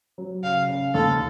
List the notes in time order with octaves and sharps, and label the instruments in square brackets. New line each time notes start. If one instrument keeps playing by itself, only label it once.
[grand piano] F#3
[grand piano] C#3 [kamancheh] F5
[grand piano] C#3
[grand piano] D#2 [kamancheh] A4